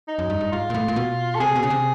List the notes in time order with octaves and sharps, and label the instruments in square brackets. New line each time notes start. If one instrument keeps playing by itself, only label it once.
[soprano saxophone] D#4
[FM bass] F#2
G2
G2
[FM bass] G#2 [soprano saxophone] F4
[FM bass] A#2
A2
A#2
B2
[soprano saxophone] A4
[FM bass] C3 [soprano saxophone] G#4
[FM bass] B2
[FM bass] C#3 [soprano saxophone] G#4
[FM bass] C3